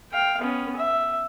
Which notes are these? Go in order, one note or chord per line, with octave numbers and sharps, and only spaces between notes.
F5 G5
B3 C#4
E5